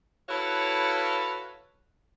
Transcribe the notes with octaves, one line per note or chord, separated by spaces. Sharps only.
E4 F#4 A4 B4 C#5 F5